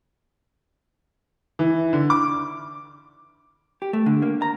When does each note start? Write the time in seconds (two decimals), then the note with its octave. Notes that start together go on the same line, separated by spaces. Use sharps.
1.59 E3
1.93 D3
2.10 D6
3.82 G4
3.93 A3
4.06 D3
4.22 A#3
4.42 A#5